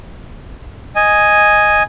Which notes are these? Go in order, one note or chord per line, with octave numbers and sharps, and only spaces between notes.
D#5 G#5